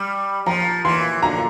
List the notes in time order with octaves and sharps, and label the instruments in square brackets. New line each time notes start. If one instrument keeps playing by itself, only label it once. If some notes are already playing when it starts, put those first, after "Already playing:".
Already playing: [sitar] G3
[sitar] F3 [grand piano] A#5
[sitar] E3 [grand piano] C6
[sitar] D3 [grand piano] A#5